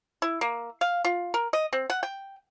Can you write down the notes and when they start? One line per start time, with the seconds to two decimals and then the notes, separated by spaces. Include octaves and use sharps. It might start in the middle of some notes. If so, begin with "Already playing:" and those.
0.22 E4
0.41 A#3
0.81 F5
1.05 F4
1.34 A#4
1.53 D#5
1.73 C4
1.90 F#5
2.03 G5